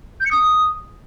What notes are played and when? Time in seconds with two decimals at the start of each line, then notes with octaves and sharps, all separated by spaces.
0.20 G6
0.26 C#7
0.31 D#6